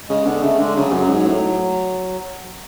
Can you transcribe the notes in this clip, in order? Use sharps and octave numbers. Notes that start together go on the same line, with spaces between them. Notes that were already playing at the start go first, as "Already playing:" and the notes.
C#3 G#3
D3 B3
C#3 A3
D3 G#3
C#3 F#3
F#2
G#2
A2